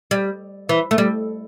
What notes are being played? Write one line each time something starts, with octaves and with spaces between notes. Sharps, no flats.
G3
E3
A3
G3